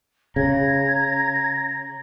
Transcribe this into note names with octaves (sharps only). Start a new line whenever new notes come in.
C#3 A#5 G#6